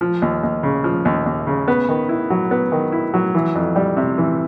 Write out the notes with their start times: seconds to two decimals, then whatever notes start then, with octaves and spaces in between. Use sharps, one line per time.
0.01 F3
0.22 D#2
0.43 D#2
0.63 C#3
0.84 F3
1.05 D#2
1.26 D#2
1.47 C#3
1.68 B3
1.89 D#3
2.09 E4
2.30 F#3
2.51 B3
2.72 D#3
2.92 E4
3.14 F#3
3.35 E3
3.55 F2
3.76 G3
3.97 C3
4.18 E3